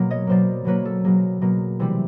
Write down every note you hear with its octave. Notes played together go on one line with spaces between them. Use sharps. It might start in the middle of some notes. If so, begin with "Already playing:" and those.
Already playing: B2 F#3 A#3
C#5 D#5
B2 F#3 A#3 C5 D5
B2 F#3 A#3 B4 C#5
A4
B2 F#3 A#3 G#4
B2 F#3 A#3
C3 E3 G3 C4